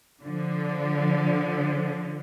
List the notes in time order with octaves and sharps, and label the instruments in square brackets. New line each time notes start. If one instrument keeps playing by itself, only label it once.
[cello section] D3 F3